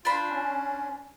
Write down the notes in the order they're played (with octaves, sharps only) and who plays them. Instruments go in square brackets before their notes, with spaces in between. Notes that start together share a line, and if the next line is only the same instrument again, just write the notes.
[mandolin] D4 C5 B5 [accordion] F4
[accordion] C#4